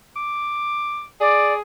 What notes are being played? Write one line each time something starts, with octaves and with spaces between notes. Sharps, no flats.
D6
G#4 D5